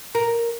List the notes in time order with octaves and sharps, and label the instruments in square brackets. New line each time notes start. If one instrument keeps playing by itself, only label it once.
[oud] A#4